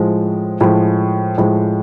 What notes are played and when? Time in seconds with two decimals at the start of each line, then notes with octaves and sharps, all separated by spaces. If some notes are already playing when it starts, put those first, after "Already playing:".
Already playing: A2 F3 G#3
0.61 A2 F3 G#3
1.38 A2 F3 G#3